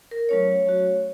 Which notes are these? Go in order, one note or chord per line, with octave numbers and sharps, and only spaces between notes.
A#4
F#3 A3 C#4 F4 C#5
F#3 A3 C#4 F#4